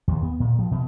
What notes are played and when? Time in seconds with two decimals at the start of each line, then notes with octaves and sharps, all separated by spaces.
0.08 D#2
0.23 B3
0.40 A#2
0.59 F3
0.71 B2